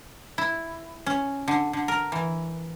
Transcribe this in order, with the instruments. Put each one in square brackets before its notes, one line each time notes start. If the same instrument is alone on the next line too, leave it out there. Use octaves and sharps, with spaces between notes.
[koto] E4
C#4
D3
D3
A#4
E3